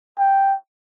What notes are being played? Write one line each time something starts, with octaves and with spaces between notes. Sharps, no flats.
G5